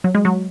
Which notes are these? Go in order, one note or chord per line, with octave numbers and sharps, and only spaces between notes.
F#3
G#3
F#3